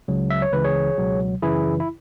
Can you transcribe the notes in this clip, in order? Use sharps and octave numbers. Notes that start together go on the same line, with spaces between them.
C#2 C#3 F#3
E5
C#5
C#2 C#3 E3 B4
G#4 C#5
C#2 B2 F#3
F#2 C#3 E3 E4 G#4
E4